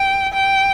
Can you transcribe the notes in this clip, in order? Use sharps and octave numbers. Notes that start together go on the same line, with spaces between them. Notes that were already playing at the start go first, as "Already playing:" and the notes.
Already playing: G5
G5